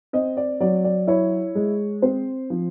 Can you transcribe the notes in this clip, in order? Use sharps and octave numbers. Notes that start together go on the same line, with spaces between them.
C4 D#5
D5
F#3 D5
D5
E4 C#5
G#3
C4 C5
F3